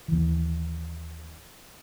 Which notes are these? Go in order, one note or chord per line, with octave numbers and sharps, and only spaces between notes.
D#2 E3